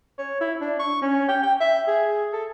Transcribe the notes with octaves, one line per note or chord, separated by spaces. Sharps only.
C#5
E4
D4
C#6
C#4
G5
G5
E5
G#4
A4